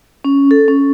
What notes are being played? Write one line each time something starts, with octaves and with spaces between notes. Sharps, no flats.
C#4
A4
C#4